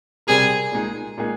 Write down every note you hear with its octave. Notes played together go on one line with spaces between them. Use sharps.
C3 G3 C4 G4 G#4 A#4
A#2 G#3 D#4 G#4
A#2 G#3 D#4 G#4